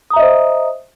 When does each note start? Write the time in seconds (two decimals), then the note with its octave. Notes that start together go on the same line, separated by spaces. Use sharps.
0.10 D#6
0.13 A#5
0.16 E5
0.19 D#5
0.22 C5